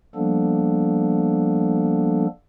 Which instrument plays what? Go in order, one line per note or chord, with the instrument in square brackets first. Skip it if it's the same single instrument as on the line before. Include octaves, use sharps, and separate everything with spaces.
[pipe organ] F3 G3 A#3 B3 D4 A4